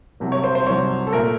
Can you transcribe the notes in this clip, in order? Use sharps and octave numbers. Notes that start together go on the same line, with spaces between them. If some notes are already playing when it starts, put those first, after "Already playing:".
C2 C3 F#3
C#5
C5
C5
C2 C3 F#3 C#5
A4
A#2 A3 A#4